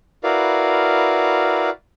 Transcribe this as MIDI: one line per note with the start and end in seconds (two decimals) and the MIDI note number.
0.24 1.70 64
0.24 1.70 66
0.24 1.70 70
0.24 1.70 71
0.24 1.70 74
0.24 1.70 77